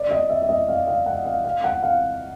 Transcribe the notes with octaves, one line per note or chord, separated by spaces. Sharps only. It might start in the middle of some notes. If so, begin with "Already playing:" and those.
Already playing: D5
D#5
E5
E5
D#5
F5
F5
F#5
F5
F5
F#5
F5